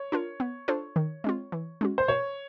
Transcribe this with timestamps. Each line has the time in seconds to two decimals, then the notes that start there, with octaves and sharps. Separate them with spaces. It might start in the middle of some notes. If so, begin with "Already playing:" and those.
Already playing: C#5
0.12 D4 F4 A#4
0.40 B3
0.68 D4 F4 A4 C5
0.96 D#3
1.24 G#3 C4 F4
1.52 E3
1.81 G#3 C#4 F#4
1.98 C5
2.08 B2 C#5